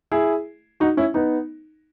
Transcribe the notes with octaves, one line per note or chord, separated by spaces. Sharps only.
E4 G#4
D#4 F#4
C#4 E4
B3 D#4